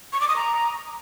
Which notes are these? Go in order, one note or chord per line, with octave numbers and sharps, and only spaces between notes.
C#6
D6
D#6
A#5